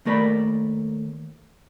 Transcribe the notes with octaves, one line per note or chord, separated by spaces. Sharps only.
D#2 A3 A#4 D5 B5